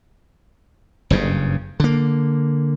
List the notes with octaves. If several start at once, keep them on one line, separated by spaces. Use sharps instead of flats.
F#1 G2 C#3
D3 A#3